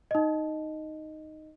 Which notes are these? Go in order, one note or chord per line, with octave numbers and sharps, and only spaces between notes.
D#4 D#5